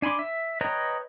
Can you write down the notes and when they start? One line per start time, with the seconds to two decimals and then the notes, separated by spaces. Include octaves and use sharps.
0.02 D4 G#5 B5 C6 D6
0.19 E5
0.61 B4 C#5 D#5 G5 A#5